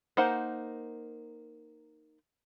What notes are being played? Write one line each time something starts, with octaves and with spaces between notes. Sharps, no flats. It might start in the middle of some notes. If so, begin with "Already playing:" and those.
A#3 D#4 C5 F#5